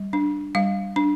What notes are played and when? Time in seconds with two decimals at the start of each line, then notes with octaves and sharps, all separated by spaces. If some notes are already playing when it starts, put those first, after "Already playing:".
Already playing: G3
0.13 D4
0.55 G3 F5
0.96 D4